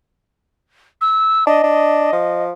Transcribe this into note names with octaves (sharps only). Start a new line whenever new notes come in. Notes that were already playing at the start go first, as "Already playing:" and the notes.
E6
D4 D#5
D4
F3